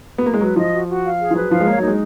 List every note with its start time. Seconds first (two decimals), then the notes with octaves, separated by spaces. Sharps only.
0.18 B3
0.26 A#3
0.34 G#3
0.40 F#3 B4
0.56 F3 D#5
0.72 F#4
0.88 F#4
1.04 F5
1.19 G#4
1.31 F3
1.35 F#3 B4
1.50 F3 F5
1.60 G#3
1.67 A#3 C#5
1.77 F#3
1.82 A#3 D#4
1.87 G#3